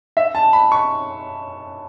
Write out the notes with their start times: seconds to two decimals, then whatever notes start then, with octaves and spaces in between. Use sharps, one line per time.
0.17 E5
0.35 A5
0.53 B5
0.72 C#6